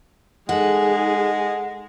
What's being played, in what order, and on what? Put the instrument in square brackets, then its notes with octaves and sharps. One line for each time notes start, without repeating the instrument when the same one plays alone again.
[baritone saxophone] G#3 [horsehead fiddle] D#4 G#4 [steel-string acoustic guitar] A4 F#5